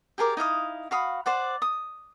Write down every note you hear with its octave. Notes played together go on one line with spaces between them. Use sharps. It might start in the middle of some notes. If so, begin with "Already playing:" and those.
G4 G#4 A#4 D5
D#4 E4 F5 D#6
F#4 F5 B5 D#6
C5 D5 F#5
D#6